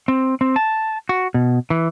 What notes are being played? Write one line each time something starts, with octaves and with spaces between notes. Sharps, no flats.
C4
C4
A5
F#4
B2
E3